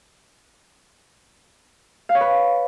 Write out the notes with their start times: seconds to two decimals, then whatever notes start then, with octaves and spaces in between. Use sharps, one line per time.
2.09 F5
2.15 C#5
2.21 B4